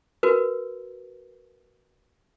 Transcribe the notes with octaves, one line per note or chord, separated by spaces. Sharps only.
F#4 A#4 B4